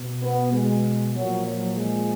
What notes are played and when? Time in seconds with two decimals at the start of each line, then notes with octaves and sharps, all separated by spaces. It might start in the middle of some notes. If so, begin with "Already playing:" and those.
Already playing: B2
0.23 B3
0.53 G#3
1.14 A#2 F3 F#3
1.45 F#3
1.75 G#3